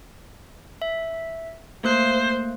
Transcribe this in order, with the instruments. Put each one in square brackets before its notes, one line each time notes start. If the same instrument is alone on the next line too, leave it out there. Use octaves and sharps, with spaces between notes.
[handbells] E5
[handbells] A3 A#3 F#6 [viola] C5